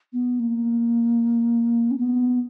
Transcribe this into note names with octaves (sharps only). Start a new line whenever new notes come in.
B3
A#3
C#4
B3